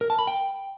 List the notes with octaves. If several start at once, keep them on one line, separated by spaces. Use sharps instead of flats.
A#4
A5
B5
G5